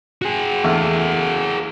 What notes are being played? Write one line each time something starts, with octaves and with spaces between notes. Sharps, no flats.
F#4 G#4
E2 A3